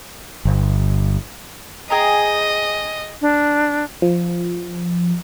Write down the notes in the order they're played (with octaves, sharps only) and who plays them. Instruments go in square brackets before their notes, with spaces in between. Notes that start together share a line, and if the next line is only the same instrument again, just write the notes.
[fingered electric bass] G1
[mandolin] G#4 G5 A#5 [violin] D#5
[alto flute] D4
[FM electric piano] F3